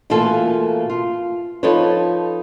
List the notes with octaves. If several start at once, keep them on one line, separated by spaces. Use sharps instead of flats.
B2 E3 A3 A#3 F4 A4
F4
F3 D#4 A4 B4 C#5